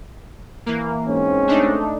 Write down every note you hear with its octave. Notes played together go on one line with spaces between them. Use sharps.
E3 A#3
G#2 C4 C#4
A3 D4 D#4